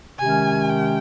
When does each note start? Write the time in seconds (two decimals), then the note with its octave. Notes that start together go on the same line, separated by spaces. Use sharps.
0.19 C3 D#3 G#3 C#4 G#5
0.69 G5